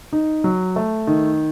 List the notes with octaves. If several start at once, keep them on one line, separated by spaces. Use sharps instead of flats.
D#4
F#3
A3
D#3